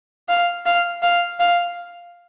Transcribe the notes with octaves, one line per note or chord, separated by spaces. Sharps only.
F5
F5
F5
F5